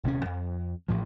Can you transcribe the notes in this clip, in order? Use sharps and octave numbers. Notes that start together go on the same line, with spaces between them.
D#1 C3 C4 C#4
F2
A1 A2 F3